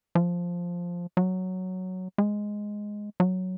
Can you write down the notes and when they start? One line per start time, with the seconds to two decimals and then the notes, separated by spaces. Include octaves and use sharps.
0.15 F3
1.17 F#3
2.18 G#3
3.20 F#3